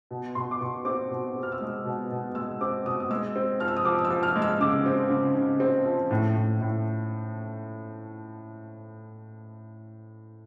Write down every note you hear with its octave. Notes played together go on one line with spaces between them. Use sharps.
B2
B2 C6
D6
B2 C#6
C4 D6
B2
C4
F6
E6
G#3 D#6
B2
B2
G#3 E6
C4 D6
B2 D#6
D#6
G#3 E6
C4
F3 F6
E6
D#6
F3 D6
D#6
E6
F3
F6
G#3
E6
C#3 D6
C4
C#3
C#3
C4
F3
A2
A2
A2